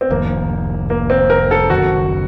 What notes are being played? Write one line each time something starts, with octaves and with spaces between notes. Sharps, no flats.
C4
F1 F2 D#3 A#3
A#3
C4
A#4
A4
F#1 F#2 D#3 F#4